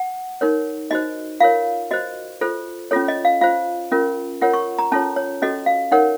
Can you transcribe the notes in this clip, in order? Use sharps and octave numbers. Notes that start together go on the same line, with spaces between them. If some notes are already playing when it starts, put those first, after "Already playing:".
Already playing: F#5
D#4 A#4 C#5
D#4 F#4 C5 D#5
F4 A#4 C#5 F5
F#4 C5 D#5
F4 A4 C5
C#4 F4 A4 C#5
D#5
F5
F4 C5 F5
C#4 F4 A#4
F4 A#4 C#5 F#5
C#6
A#5
C#4 F4 A4 C#5 A5
C#5
C#4 F#4 A4 D#5
F5
D#4 A#4 C#5 F#5